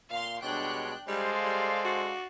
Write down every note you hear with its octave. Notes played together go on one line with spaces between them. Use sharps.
A#2 F5 C6
B2 G3 G#3 D4 C#5 G5 F#6
G3 G#3 A4 C5 D5 F5
G3
F#4